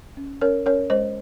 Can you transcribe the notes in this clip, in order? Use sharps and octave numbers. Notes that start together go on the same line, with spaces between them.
C#4
C#4 A#4 C#5
C#4 A#4 C#5
G#3 C5 D#5